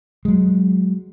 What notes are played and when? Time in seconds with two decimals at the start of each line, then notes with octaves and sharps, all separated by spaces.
0.25 F#3 G#3